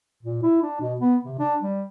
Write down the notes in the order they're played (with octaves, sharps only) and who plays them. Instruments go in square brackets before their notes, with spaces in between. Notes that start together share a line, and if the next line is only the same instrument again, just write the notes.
[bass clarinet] A#2
E4
D4
B2
B3
C3
D4
G3